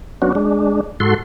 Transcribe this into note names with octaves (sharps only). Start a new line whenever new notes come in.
F#3 B3 C#4 D4 F#4
G#3 D4
G#2 F#4 A4 C6